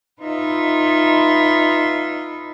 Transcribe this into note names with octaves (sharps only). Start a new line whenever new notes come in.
D#4 F4 B4 E5